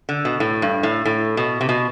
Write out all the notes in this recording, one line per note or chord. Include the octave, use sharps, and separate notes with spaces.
D3
B2
A2
G2
A2
A2
B2
C3
B2